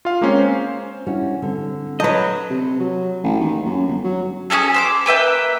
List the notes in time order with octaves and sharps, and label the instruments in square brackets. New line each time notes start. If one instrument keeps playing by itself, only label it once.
[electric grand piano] F4 F5
G#3 A#3 C4 C#4
C5
[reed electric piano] G3 D4 E4 [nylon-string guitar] C#4 F#4
[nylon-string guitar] D3 [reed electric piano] G3 C4
[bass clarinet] F#3 [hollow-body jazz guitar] B4 D#5 [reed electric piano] A5 G6
[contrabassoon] C3
F#3
A1
D#2
F#2
G1
F#3
[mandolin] C#4 D#4 G#4 A4
C5 B5 D6
A#3 B4 E5 G5